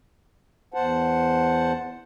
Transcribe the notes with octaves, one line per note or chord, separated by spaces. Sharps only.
E2 C5 F#5 A5